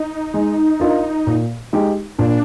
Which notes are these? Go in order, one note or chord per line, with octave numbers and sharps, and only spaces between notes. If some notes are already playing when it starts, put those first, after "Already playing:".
Already playing: D#4
G#3
D4 F4 A#4 D#5
A#2
G#3 D#4 G4
A#2 D4